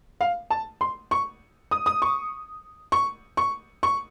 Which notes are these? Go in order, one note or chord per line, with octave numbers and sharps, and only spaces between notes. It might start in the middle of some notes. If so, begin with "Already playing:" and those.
F5
A5
C6
C#6
D#6
D#6
C#6
C#6
C#6
C#6